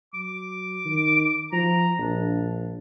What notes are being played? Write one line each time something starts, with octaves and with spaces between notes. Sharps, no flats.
F#3 D6
D#3
F3 A#5
A#1 D4